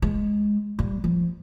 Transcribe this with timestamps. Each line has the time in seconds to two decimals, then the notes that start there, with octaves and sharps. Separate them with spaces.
0.02 G#3
0.79 G3
1.04 F3